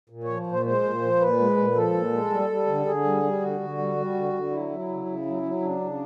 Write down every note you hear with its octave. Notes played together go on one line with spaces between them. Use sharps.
A#2
F3 C#5
A#2
C5
G#3 C5
A#2
F3
A#2 B4
G#3
A#2
F3 A4
A#2
G#3
G3
G3
D3
D3 G#4
G3
G3
D3 F#4
D3
G3
G3
D3
D3
F#3 E4
F#3
C#3
C#3
F#3
F#3
C#3 D4
C#3